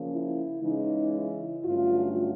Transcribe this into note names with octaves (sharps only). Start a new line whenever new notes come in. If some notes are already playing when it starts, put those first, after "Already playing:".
Already playing: C#3 F3 A#3 C#4
E4
C#3 E3 G#3 C#4 D#4
E4
G2 D3 F#3 A3 C#4 F4